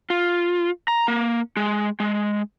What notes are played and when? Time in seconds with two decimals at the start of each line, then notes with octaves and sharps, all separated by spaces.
0.10 F4
0.88 A#5
1.08 A#3
1.57 G#3
2.00 G#3